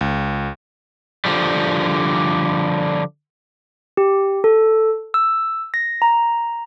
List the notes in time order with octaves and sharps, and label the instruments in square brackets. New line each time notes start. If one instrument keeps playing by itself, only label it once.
[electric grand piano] C#2
[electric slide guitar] D3 F3 G3
[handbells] G4
A4
E6
A#6
A#5